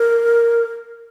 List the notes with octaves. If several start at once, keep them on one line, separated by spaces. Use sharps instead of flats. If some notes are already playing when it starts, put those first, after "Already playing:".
Already playing: A#4